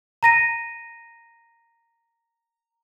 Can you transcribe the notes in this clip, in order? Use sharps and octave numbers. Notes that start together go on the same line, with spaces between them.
A#5 A#6 D#7